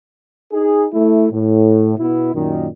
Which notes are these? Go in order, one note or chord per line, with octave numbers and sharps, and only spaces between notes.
D#4 G#4
A3 E4
A2
B2 B3 E4
F#2 A#2 D#3